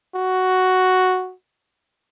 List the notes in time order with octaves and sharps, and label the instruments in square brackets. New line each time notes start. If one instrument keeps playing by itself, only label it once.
[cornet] F#4